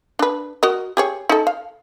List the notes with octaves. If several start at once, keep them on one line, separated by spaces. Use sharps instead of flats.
D4 B4
F#4 A#4 D#5
G4 G#4 C#5
D#4 A4
F5